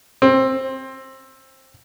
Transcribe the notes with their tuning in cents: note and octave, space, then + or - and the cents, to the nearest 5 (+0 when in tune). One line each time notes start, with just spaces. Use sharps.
C4 +15